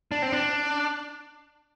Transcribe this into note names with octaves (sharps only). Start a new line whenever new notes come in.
D4
C4
D4